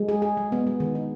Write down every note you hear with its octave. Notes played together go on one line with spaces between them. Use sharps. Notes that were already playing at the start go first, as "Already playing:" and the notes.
Already playing: G#3
G#4
G#4
G#3
B3
G#3
D#3
D#4